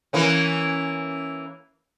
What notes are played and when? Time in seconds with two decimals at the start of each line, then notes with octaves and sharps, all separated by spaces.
0.13 E3 A#3 C#4